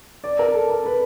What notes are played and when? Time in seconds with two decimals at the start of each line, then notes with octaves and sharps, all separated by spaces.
0.24 D5
0.39 A#4
0.54 A4
0.70 A#4
0.86 B4